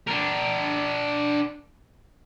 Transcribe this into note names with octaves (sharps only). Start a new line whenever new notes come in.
D4 A#4